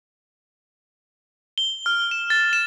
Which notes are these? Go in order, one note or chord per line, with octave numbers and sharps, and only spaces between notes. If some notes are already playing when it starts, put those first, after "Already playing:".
G7
F6
E7
A6
E7